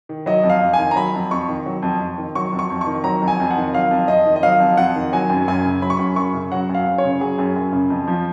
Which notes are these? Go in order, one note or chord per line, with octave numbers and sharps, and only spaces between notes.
D#3
F#3 D#5
F2
F5
F2
G#5
D#3
A#5
F#3 B5
F2
F2 C#6
D#3
F#3
F2
F2
D#3
F#3 C#6
F2
C#6
F2
C#6
D#3
F#3 A#5
F2
G#5
F2
F#5
D#3
F#3 F5
F2
F2 D#5
D#3
D#5
F#3 F5
F2
F2 F#5
D#3
F#3 G#5
F#2
F#2 G#5
C#3
F#3 B5
C#6
F#2 B5
F#2 C#6
C#3
F#3 F#5
F#2
F5
F#2
C#5
C#3
F#3 G#4
F#2
F#2
C#3
F2
F3